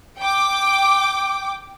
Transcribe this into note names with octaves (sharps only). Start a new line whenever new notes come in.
G5 D6